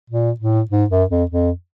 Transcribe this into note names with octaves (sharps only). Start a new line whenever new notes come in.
A#2
A2
G#2
F#2
F2
F2